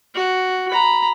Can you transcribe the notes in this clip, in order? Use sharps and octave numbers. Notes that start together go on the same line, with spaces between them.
F#4
A#5 B5